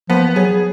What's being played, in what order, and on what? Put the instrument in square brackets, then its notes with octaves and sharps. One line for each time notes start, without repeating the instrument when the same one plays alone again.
[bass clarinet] F3 [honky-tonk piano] B3
[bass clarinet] F#3 [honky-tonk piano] G#4